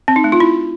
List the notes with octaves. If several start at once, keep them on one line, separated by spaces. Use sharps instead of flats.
C4
D#4
A3
F4
E4